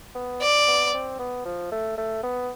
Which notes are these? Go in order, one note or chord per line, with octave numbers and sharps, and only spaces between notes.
B3
D5
B3
C4
B3
F3
A3
A3
B3